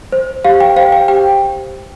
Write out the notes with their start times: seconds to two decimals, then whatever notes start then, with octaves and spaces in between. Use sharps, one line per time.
0.12 C5
0.45 G4 F5
0.60 G5
0.76 C5 F5
0.92 G5
1.08 G4 G5